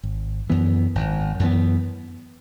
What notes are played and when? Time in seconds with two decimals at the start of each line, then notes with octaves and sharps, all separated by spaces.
0.03 G#1
0.50 F#2 E3 B3
0.95 G#1
1.40 F#2 E3 B3